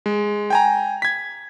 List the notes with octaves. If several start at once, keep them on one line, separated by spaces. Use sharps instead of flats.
G#3
G5 G#5 A#5
G#6 B6